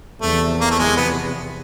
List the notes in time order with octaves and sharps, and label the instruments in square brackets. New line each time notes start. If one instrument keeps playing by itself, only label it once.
[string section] E2 C3 F3 [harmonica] A3
[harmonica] A#3
A3
G#3
B3